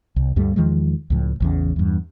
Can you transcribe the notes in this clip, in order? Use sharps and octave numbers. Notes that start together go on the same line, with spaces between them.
C2
D2 G2 G3 A3
E2 D#3 F3 G#3
C#2 A2 F3
A1 E2 C#3
E2 G2